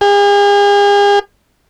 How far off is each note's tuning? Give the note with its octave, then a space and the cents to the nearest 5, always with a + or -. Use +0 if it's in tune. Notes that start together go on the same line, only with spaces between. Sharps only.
G#4 -40